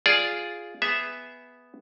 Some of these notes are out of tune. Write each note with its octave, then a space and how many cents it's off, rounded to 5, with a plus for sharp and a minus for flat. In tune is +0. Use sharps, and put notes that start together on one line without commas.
F4 +0 G#4 +0 D5 -10
B3 +0 G#4 -10 E5 +0